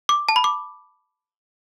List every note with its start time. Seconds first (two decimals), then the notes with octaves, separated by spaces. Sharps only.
0.09 D6
0.29 A5
0.36 B5
0.44 D6